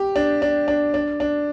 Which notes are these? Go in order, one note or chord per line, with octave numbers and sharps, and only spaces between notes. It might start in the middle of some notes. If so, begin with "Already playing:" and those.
Already playing: G4
D4
D4
D4
D4
D4